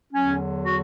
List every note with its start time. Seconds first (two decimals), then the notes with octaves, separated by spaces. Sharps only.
0.13 E2 D3 F#3 C#4
0.65 F#4